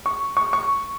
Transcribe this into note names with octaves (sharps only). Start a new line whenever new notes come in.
C#6
C#6
C#6